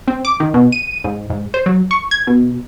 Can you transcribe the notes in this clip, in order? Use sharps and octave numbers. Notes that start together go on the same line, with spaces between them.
C4
D6
D#3
B2
D#7
G#2
G#2
C5
F#3
C#6
G#6
B2